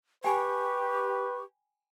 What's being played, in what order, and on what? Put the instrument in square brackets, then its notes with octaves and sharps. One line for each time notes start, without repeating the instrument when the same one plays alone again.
[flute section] G4 [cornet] B4 [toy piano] G5 G#5 B5 [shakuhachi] C#6